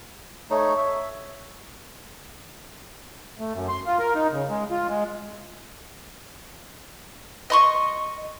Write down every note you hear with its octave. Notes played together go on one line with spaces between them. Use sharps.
A3 D#4 C#5
E5
A3
F#2
C6
F4
A#4
D#4
C#3
G#3
F4
G#3
D#5 C6 C#6